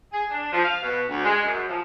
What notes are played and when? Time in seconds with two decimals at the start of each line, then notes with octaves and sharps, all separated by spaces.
0.12 G#4
0.30 D4
0.52 F3
0.63 F5
0.82 B2
1.07 D2
1.24 G#3
1.44 F#2
1.68 F3